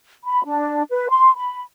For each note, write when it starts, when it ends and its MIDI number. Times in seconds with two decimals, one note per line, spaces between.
0.24 0.43 83
0.44 0.82 62
0.90 1.09 71
1.09 1.30 84
1.36 1.61 83